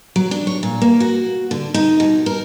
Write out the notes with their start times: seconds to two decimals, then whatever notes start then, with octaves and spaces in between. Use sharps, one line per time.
0.16 F#3
0.31 D4
0.47 C#5
0.63 A#2
0.82 A#3
1.00 F#4
1.51 D3
1.74 D#4
2.00 B2
2.26 A#4